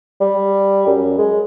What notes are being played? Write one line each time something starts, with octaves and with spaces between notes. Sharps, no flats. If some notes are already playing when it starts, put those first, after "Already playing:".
G3
F#2
G#3